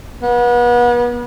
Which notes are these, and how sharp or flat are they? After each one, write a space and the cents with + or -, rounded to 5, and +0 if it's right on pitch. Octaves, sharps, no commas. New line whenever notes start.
B3 -35